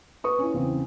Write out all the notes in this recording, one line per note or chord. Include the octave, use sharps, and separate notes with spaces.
B4 C#6 D#6
C#4 E4
E2 C#3 C4